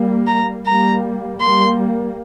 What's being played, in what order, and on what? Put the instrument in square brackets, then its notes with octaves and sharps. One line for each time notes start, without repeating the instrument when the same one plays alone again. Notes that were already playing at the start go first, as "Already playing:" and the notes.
Already playing: [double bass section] G3 A#3
[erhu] A#5
[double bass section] G3 A#3 [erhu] A#5
[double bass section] G3 A#3 [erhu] C6